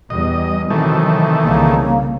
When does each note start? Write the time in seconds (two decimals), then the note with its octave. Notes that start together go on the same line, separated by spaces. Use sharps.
0.10 E2 G3 D#5
0.70 C3 D#3 E3 F#3 A3
1.43 C2 C#3 A#3